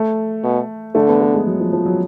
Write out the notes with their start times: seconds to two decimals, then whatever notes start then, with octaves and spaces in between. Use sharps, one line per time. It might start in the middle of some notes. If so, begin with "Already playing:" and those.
Already playing: A3
0.44 B2
0.95 D3 A3
1.08 B3
1.21 A3
1.34 G#3
1.46 F#3
1.60 F3
1.73 F3
1.86 F#3